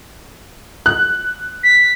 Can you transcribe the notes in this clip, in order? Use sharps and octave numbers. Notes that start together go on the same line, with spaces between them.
F#6
B6